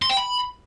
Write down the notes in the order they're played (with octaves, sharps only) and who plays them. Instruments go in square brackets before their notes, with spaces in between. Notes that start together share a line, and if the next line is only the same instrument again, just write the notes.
[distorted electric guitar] C6
G5
B5